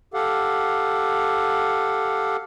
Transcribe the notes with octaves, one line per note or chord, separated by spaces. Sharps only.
G4 A4 F5 F#5